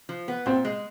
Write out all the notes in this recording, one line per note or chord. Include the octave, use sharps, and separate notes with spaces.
F3
B3
A#2 C4
G#3